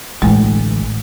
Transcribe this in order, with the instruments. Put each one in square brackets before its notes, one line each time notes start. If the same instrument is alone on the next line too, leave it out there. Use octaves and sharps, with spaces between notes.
[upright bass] A1 D3 [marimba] G#3 A3